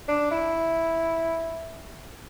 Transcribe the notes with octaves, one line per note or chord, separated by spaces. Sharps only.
D4
E4